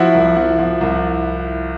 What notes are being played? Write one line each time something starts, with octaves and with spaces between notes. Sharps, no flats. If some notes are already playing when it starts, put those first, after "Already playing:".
Already playing: F3 E4 F#4
C2
F3
F3
C2